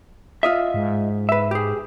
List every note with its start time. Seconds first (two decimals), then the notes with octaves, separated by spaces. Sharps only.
0.43 F4 D#5 E5
0.74 G#2
1.29 B4 E5
1.51 G4 G#4